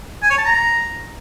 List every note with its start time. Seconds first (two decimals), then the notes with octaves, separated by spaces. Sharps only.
0.22 G#5
0.30 C#5
0.38 A5
0.45 A#5